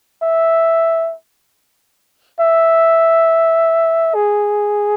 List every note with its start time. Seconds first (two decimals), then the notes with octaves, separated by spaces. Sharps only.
0.23 E5
2.40 E5
4.15 G#4